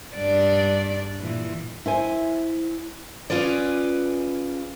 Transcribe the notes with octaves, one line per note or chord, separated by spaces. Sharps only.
G2 D4 D5
A#2 E3
E4 C5 G#5
C#4 F4 G#4 B4 D5